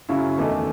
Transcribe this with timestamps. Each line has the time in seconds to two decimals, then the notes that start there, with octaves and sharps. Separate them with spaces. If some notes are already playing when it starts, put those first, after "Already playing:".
0.09 F#2 C#3 F#3 C#4 E4
0.38 E2 D#3 A3 D#4